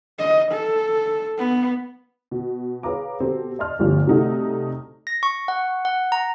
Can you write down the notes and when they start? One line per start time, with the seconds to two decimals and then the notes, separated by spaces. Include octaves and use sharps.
0.18 D#5
0.52 A4
1.38 B3
2.31 B2
2.83 G#4 B4 C#5 F5 A#5 D6
3.20 B2 C4 G4 A4
3.59 D5 D#5 A5 C6 F6
3.79 G1 D2 G2 F3
4.07 C3 G3 A3 D#4 F#4 A4
5.07 A#6
5.23 C#6
5.48 F#5
5.85 F#5
6.12 A#5